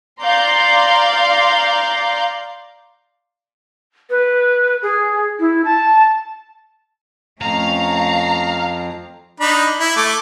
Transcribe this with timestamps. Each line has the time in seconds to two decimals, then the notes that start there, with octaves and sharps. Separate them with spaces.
0.21 D5 F5 A#5 C6 G6
4.10 B4
4.82 G#4
5.40 E4
5.65 A5
7.41 F2 A3 C#4 F5 A#5 C7
9.40 D4 D#4 B5
9.80 E4
9.97 A3 D6